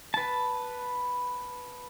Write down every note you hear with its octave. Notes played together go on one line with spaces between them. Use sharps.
B4 A5